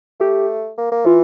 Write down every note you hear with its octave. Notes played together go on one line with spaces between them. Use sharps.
A3 G4
A#3
A#3
E3 F4